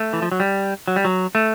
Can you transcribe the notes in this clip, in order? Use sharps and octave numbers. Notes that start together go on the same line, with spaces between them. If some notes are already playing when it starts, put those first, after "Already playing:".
Already playing: A3
E3
F3
F#3
G3
F#3
G3
F#3
A3